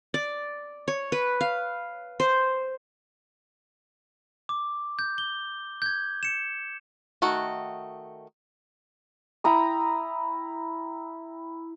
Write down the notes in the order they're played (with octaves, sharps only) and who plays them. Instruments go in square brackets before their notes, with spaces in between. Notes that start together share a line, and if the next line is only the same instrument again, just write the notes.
[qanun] D5
C#5
B4
F5
C5
[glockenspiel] D6
G6
G7
G6 G#6
C#7 E7
[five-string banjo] D#3 A3 F#4
[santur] E4 G5 A#5 D#6